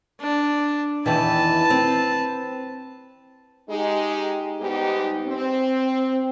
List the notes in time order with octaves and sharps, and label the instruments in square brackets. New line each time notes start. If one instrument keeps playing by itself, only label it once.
[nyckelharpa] D4
[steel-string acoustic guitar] E2 D#3 E3 [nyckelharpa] B4 A5
[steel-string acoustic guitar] C4
[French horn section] G#3 D#4 G4
G#2 G3 G#3 B3 D#4 G4
C4